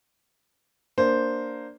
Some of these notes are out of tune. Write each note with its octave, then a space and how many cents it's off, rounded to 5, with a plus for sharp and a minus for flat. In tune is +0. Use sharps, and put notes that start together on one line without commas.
A#3 +0 D4 +0 C5 +0